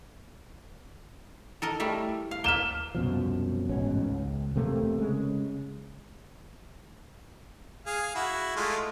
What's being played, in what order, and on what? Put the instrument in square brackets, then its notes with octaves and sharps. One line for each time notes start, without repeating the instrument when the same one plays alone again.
[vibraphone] E4 [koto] A4 A#4 D#5
[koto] G3 A3 E5
F5
[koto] A#3 E5 [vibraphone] B4 [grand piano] F6 E7 G7
[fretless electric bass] C2 F#2 B2 F3
A1 G#2 B2 C#4
C#2
E1 C3 A3 A#3
C#3 G#3
[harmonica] G#4 F5
E4 F#4
G#3 A3 F4